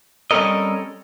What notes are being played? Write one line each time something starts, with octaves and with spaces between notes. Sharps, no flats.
G3 C4 C#4 A4 A#4 D#5